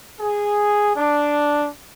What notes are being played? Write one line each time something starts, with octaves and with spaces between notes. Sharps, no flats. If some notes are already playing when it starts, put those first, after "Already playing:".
G#4
D4